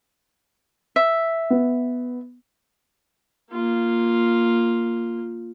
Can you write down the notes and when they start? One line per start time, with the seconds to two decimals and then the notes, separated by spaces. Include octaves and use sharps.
0.96 E5
1.50 B3
3.51 A#3 F4